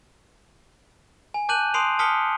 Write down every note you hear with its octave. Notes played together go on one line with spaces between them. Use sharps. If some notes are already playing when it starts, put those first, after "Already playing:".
G#5
A5 D6 F#6 G6 D#7 F#7
A5 C6 D#6 C7 D7 F7
A5 D#6 F6 B6 C#7 G7